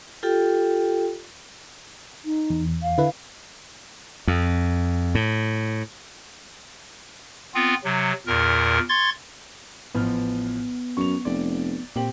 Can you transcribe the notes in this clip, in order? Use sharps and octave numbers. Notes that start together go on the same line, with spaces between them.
F4 G4 A4 G5
D#4
E2
F5
D3 E4 B4
F2
A2
B3 C4 F4
C3 F#3
E2 A#2 A#4
C6 C#6 G#6 A6
A1 F3 B3 F6
F#2 C#6 F7
F1 D5
A#2 C4 G4 F#7